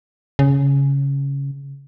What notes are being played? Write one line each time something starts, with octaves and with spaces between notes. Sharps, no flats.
C#3